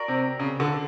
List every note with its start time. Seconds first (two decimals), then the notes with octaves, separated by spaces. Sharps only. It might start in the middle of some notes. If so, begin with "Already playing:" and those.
Already playing: F#4 A#4 D5
0.08 C3
0.39 C#3
0.60 D3